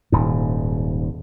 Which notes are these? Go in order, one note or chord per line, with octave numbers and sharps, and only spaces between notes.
D#1 G#2